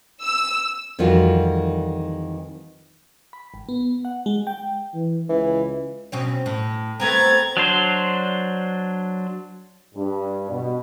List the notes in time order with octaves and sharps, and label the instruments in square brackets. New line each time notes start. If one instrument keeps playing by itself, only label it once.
[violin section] E6
[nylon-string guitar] F2 D#3 E3 G3 F4 F#4
[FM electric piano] B5
G#1
B3
F#5
G#3
G5
[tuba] E3
[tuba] C#2 [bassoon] E3
[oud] B2 C4 C#4
A2
[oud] A3 B3 C4 [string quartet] A#5 G#6 A6
[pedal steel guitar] F#3 D4 C5
[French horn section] G2
B2